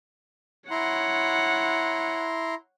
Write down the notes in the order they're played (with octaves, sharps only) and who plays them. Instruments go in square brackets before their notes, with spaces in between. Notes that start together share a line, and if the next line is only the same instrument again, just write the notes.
[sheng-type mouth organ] E4 A#5 C6 [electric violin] C#5 F#5